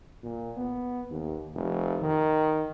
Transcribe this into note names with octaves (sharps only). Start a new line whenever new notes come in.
A#2
B3
D#2
F1
D#3